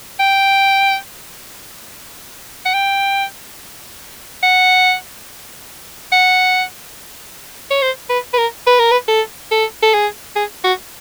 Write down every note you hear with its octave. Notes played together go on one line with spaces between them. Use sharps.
G5
F#5
G5
F#5
F#5
C#5
C5
B4
B4
A#4
B4
A#4
B4
A4
A4
A4
G#4
G#4
F#4